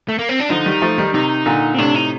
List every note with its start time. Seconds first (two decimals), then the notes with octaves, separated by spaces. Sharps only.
0.09 A3
0.19 A#3
0.29 C4
0.40 D4
0.50 D3 F3 D#4
0.66 D#3 G3
0.82 F3 A3
0.98 D#3 G3
1.14 C3 D#3 D#4
1.46 A#2 D3
1.74 C4
1.78 A2 C3 D4
1.95 D#4